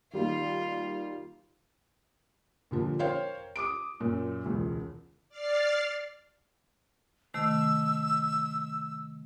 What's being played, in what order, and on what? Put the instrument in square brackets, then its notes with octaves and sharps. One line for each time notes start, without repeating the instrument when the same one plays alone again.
[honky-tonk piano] D#3 G3 A#3 [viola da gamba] F4
[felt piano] A#2 D3 F3 G3 A#3
A#4 C5 C#5 F5 G5
D6 D#6 D7
F#2 A#2
E1 C#2
[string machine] D5 F6 A6 C7
[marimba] C3 D#3 A3 [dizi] E6